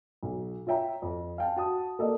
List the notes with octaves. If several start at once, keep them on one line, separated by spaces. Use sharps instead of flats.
B1
F4 C#5 E5 G5 A#5
F2
F5 G5 A5
F#4 A5 D#6
A#3 A4 D5 D#5